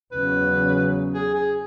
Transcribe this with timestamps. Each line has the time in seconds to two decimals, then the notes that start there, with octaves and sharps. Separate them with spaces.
0.12 E2 C#3 F#3 B4
1.15 G#4
1.35 G#4